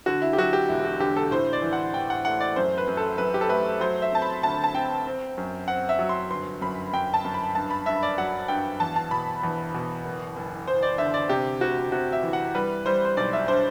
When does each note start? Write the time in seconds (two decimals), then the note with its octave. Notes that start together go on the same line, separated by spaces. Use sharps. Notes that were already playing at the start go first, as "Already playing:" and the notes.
0.06 D3 F#4
0.22 E4
0.33 G4
0.38 F#3 F#4
0.53 G4
0.69 E1 E4
0.85 F#4
1.00 D3 G4
1.16 A4
1.31 A2 C5
1.53 D5
1.62 E3
1.73 F#5
1.93 A1 G5
2.10 F#5
2.25 A3 F#5
2.40 D5
2.56 F#2 C5
2.78 B4
2.87 F#2
2.97 A4
3.18 F#2 B4
3.34 G4
3.41 A4
3.49 A3 B4
3.81 F#3 C5
4.02 E5
4.12 C4 A5
4.22 B5
4.43 D2 A5
4.64 A5
4.74 C4 G5
5.06 C4
5.38 F#2
5.68 C4 F#5
5.89 E5
5.99 F#3
6.09 C6
6.30 G1 C6
6.61 F#2 B5
6.93 F#2 G5
7.14 A5
7.25 F#2
7.34 B5
7.55 G2 A5
7.71 B5
7.86 G2 E5
8.03 D5
8.18 F#3 F#5
8.48 G2 G5
8.80 E2 A5
8.96 A5
9.11 B2 B5
9.43 E2
9.74 B2
10.04 F#1
10.37 F#1
10.67 F#1 C5
10.82 D5
10.98 D3 E5
11.14 D5
11.29 C3 G4
11.61 D2 F#4
11.92 C3 F#4
12.13 E5
12.23 E3
12.33 F#5
12.55 G3 B4
12.86 G3 C5
13.05 C5
13.17 B1 D5
13.33 E5
13.48 D4 C5